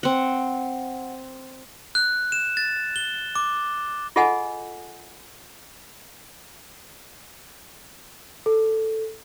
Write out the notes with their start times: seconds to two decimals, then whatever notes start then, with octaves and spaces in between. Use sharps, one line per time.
0.03 C4 F#5
1.95 F#6
2.32 E7
2.57 A6
2.96 G7
3.35 D6
4.16 F4 G#4 A4 D#5 F#5 G#5
8.46 A4